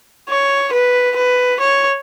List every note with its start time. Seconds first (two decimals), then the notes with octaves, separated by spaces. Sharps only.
0.29 C#5
0.72 B4
1.16 B4
1.60 C#5